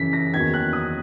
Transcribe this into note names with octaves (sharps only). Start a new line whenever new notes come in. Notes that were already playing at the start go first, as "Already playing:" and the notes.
Already playing: F#2 C#3 E3 B6
A#6
E2 D#3 F#3 A#3 G#6
F#6
D#6